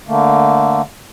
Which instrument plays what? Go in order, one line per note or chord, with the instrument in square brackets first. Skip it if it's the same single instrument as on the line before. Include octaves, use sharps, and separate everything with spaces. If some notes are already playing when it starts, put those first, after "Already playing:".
[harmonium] D3 A3 A#3